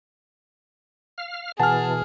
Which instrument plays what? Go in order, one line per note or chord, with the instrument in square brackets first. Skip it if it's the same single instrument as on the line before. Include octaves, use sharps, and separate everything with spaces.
[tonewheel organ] F5 F6
[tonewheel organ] B2 E3 [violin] G#4 [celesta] F#5 G#5 [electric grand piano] A5 F6